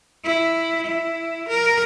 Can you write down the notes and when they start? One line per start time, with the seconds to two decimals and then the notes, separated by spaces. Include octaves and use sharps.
0.24 E4
0.86 E4
1.49 A#4